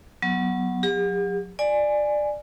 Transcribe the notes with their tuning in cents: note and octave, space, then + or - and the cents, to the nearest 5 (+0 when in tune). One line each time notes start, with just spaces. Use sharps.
F#3 +0 B3 -5
F#3 -30 G4 +45
D5 +15 G#5 +0